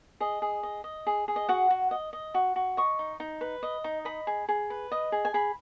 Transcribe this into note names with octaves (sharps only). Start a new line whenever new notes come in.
G#4 D#5
G#4
D#5
D#5
G#4
G#4
D#5
F#4 F#5
F#4
D#5
D#5
F#4
F#4
D#5 C#6
D#4
D#4
B4
D#5
D#4
D#5 B5
G#4
G#4
B4
D#5
G#4
G#5
G#4 B5